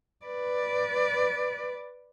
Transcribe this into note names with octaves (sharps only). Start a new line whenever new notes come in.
B4 D5